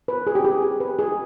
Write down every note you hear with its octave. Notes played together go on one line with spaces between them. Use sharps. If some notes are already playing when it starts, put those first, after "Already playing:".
B4
G#4
G4
G#4
G#4
B4
G#4